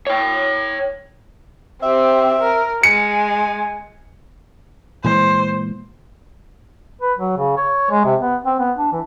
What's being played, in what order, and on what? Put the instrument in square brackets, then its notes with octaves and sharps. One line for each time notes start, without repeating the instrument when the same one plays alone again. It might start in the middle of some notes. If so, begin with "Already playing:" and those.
[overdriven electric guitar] C#5 G5
[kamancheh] C4 G4 [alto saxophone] E5
[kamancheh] A#4
[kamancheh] G#3 [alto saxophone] G#5 [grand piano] C#7
[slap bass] A#2 E3 G#3 [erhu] C5
[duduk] B4
F#3
C#3
C#5
G#3
C3
B3
C4
B3
D4
E3